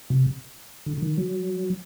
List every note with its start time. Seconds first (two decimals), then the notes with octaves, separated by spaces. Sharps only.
0.10 C3
0.86 D3
0.98 D3
1.02 D#3
1.17 F#3